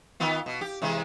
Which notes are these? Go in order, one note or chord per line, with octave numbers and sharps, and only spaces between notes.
D#3 B3 F4
B2
G4
C3 E3 G#3